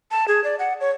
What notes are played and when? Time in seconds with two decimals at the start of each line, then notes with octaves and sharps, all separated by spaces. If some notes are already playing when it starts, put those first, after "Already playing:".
0.11 A5
0.28 G#4
0.44 D5
0.59 F#5
0.81 C#5